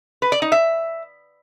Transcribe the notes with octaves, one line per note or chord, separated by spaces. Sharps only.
B4
D5
D#4
E5